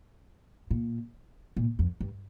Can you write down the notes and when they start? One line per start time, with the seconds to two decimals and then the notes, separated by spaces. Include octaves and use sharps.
0.71 A#2
1.57 A#2
1.79 F2
2.00 G2